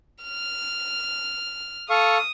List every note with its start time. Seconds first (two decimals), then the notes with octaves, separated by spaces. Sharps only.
0.23 F6
1.90 A4 F5 C#6 D#6